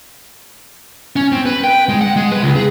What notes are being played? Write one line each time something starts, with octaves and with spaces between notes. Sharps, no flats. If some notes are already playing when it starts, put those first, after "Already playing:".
C#4
C4
B4
G5
G#3
F#5
G#3
B4
C#2
G#4